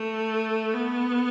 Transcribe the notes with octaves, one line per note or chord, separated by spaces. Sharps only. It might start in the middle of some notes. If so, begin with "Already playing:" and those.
Already playing: A3
B3